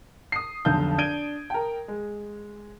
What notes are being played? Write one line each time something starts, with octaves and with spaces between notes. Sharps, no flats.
D#6 C7
F1 B1 D3 A5 G6
D4 G#6 D7 D#7 G7
A#4 G5
G#3